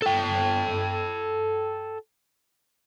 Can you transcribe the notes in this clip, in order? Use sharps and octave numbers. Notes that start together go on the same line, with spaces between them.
A4 G5